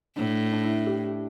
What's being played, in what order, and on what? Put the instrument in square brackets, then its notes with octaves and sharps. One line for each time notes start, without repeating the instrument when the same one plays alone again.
[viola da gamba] A2 [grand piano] D4
[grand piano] D4
E4
G4